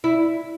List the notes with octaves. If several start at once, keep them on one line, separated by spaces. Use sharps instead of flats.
E4